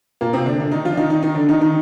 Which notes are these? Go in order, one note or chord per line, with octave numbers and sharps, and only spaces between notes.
A#2 A#3
C3 C4
D3 D4
D3 D4
D#3 D#4
F3 F4
D4
D#3 D#4
D#3 D#4
D#3 D#4
D3 D4
D#3 D#4
D#3 D#4